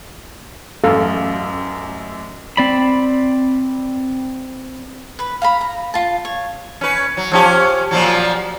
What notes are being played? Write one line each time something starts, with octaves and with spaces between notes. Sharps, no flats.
A1 F#2 A4 F5
C4 D5 B5
B4 B5
F5 A#5 B5
A#5
F4 A5
C#5
C#4 B4
F#3
F3 C#4 G4
A#2 F3 F#3